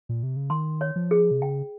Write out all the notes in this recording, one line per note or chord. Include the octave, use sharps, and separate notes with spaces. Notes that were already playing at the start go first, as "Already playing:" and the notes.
A#2
C3
C#3
D#3 C6
C#5
F3
G#4
C3
C#3 G5